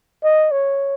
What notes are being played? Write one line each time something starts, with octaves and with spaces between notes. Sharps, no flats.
D#5
C#5